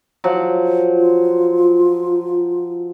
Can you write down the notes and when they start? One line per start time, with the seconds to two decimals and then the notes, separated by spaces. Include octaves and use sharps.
0.24 F3 F#3
0.96 F4